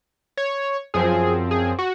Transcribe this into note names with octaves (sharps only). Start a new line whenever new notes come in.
C#5
F#2 F3 C4 G#4
G#4
F#4